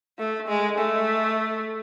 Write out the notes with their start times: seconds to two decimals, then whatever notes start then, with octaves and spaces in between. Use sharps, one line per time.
0.19 A3
0.48 G#3
0.79 A3